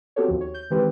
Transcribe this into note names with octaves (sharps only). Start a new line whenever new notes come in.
B3 C4 F#4 G4 A4 C#5
D#2 F3
C#5
G6
D#3 E3 G#3 C4 G4 B4